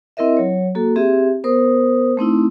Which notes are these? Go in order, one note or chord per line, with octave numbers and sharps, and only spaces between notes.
C4 E4 A#4 D#5 E5
F#3 C#5
A#3 F#4 A4
C4 G4 G#4 E5
B3 A#4 C5 D#6
A3 C4 D#4 E4